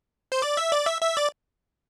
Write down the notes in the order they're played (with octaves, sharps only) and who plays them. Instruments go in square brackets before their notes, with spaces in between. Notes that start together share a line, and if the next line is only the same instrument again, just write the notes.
[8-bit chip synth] C5
D5
E5
D5
E5
E5
D5